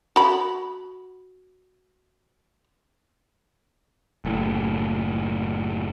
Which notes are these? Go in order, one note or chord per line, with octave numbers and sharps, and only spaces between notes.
F#4 B5
F#1 A2